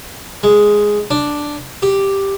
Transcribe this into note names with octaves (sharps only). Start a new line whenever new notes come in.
G#3
D4
G4